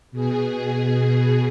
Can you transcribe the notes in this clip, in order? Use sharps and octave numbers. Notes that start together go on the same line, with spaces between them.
B2 G#4